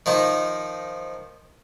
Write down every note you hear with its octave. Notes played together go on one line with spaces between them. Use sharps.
D#3 F3 D#4